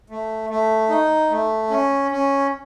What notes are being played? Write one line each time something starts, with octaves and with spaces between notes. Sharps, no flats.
A3
A3
D#4
A3
C#4
C#4